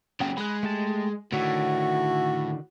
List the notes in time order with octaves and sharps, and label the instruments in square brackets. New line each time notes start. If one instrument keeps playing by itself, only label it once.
[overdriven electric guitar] A#2 C#3 [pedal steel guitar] F#3 G5
[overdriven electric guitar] G#3 [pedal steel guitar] B5 F#6
[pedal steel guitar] A3 G4 A5
[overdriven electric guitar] A2 [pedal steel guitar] D3 D#3 E5 [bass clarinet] F#4